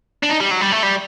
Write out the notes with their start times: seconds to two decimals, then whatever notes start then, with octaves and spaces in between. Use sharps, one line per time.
0.23 D4
0.29 D#4
0.40 G3
0.51 F#3
0.61 G3
0.72 A3
0.83 G3